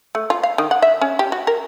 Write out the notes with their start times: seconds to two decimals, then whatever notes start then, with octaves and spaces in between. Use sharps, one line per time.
0.15 A3
0.30 F4
0.43 F5
0.58 D#3
0.71 F#5
0.82 E5
1.01 C#4
1.19 G4
1.32 F#4
1.47 A#4